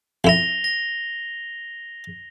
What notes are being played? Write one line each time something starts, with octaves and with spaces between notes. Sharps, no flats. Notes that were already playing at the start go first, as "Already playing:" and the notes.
F2 E4 A#6 F7 G7
A#6